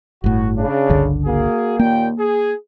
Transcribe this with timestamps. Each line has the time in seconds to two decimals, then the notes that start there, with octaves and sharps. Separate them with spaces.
0.24 G1 A2 F#4
0.58 C#3 D4
0.89 G1 C#2 D3
1.26 A#3 F#4 G#4
1.79 D#2 A#2 A#3 G5
2.19 G#4